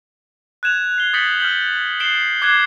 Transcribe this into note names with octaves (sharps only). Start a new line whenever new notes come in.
F#6 G#6 E7 F7
C7 G7
D#6 G6 A6 B6 C#7 F#7
F6 G6 F#7
C7 D7 E7 G7
D6 F#6 G#6 C7